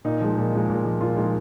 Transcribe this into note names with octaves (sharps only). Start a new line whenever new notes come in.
A#2 D#4
F3 G#3
A#2
F3 G#3
A#2
F3 G#3
A#2 F4
F3 G#3 D#4